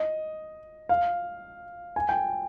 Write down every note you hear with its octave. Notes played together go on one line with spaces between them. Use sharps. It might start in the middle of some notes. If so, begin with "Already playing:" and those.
Already playing: D#5
F5
G#5
G5